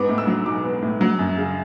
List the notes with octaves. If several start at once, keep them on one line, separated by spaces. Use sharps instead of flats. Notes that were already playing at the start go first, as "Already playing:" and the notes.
Already playing: G#2 B3 D6
A2
E6
F#3
B1 D6
B3
A2
F#3
F#2
C#3